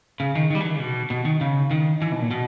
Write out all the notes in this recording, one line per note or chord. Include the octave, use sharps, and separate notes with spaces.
C#3
D#3
D#3 G3
E3
D#3
C#3
B2
B2
D#3
C#3
D#3
E3
B2
A#2
B2